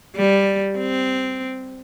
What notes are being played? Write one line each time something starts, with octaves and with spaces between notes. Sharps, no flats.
G3
C4